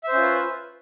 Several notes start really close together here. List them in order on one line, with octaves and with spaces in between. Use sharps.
E5 C5 C#4 F4 B4